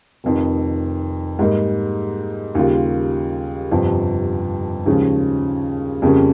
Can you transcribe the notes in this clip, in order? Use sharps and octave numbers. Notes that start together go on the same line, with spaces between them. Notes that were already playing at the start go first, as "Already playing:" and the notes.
F1 F2 D#3
G#2 G3 A#3 D#4
D#2 C#3 G3 A#3 F4
G1 F2 C3 F3
D#2 C#3 F3 G#3 C#4
F2 C#3 G3 A#3 C#4